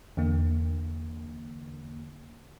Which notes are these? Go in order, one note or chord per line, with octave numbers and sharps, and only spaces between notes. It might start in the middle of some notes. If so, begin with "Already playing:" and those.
E2 D3 A#3